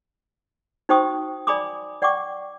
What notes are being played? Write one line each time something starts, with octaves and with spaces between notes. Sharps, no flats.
D#4 F#4 C5 G5 C#6 D#6
D5 G#5 B5 C6 D6 D#6
D5 F#5 G5 C#6 D6